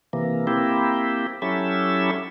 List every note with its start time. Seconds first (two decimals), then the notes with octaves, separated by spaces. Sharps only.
0.13 C3 E3 A#3
0.47 A#3 C4 E4 G4
1.42 F#3 C#4 E4 G4 A4 E5